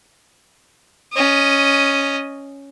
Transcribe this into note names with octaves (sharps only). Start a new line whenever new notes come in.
C#4 D#5